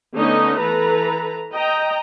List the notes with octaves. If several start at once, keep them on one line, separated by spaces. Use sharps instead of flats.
D3 A3 B3 C#4 D#4 D#5
E3 A4 B4 A#5
D#5 G5 A#5